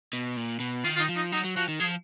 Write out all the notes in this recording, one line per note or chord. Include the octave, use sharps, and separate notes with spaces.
B2
A#2
B2
D#3 F4
F4
D#4
F3
D#4
F#3 D#4
F#3
F3 F#4
D#3
F3 G#4